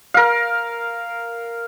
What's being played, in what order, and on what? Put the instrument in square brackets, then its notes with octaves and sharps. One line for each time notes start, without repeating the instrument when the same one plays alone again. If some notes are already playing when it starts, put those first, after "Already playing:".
[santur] A#4 F5